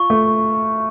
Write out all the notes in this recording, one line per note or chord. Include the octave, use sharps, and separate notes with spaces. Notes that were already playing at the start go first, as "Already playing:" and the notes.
Already playing: F4 C#6
A3